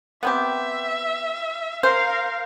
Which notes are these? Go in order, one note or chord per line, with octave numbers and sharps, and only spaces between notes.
B3 C4 G4 E5
A#4 C5 F5